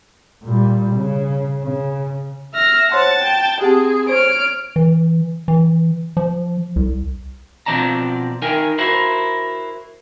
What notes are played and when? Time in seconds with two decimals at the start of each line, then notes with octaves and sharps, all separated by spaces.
0.43 A#2 G3
0.96 C#3
1.64 C#3
2.54 E5 F6 A#6
2.92 C5 C#5 F#5 A5 C6 A6
3.22 G5
3.61 C4 G4 G#4 F#5 A5
4.09 C5 C#5 F6 D7
4.76 E3
5.48 E3
6.17 F3
6.76 C2
7.66 B2 F3 C4 D5 A5 A#5
8.42 D#4 A#4 G5 G#5
8.78 E4 F#4 A#4 C5